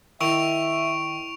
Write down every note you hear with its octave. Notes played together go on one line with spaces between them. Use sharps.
D#3 E4 E5 C#6 D7 F7